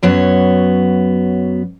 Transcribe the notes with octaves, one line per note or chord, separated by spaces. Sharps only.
F#2 F#3 B3 C#5